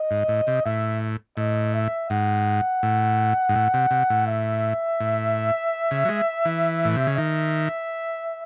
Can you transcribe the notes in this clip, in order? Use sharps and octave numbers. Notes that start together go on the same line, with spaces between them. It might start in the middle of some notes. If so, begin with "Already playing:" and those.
Already playing: D#5
G#2
A2
C3
A2 E5
A2 D#5
E5
G#2 F#5
A2
G#2
A2
C3
C3
A2
E5
A2
C#3
F#3
G#3
E3
A2
C3
C#3
D#3 E5